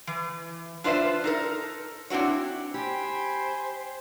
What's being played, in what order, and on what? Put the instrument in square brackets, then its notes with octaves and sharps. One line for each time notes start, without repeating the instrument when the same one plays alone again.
[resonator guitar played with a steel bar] E3
D4 F4 B4 C5 D5 E5
D#4 A4 A#4
C4 D4 E4 F#4 C#5
[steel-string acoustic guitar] G4 [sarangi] C5 [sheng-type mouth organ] G5 G#5 B5